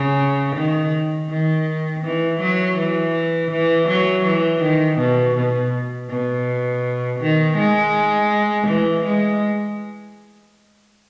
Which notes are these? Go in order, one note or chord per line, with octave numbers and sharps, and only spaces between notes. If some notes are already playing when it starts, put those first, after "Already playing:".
Already playing: C#3
D#3
D#3
E3
F#3
E3
E3
F#3
E3
D#3
B2
B2
B2
D#3
G#3
E3
G#3